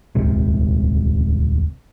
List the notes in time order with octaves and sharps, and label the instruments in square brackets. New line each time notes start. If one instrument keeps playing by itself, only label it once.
[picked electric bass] D#1 C#2 G#2 C3